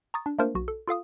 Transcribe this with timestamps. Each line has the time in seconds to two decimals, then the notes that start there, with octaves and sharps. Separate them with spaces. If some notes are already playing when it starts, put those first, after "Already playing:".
0.14 A#5 C#6 D#6 A6
0.26 D4
0.39 A3 A#3 D4 F4 A#4 C5
0.55 B1 F#4
0.68 A4
0.88 F4 A4 F5 D#6